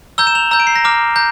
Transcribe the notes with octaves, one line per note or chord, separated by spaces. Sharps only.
A#5 E6 G6 G7
E7
F7
A#5 E6 G6
D7
C7
A#6
A#5 D6 F6
A#5 G6